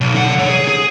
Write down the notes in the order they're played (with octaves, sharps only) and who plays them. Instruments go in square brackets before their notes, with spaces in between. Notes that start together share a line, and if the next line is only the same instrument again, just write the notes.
[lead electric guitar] B1
D3 F#5
E3 C#5
G#4
G#4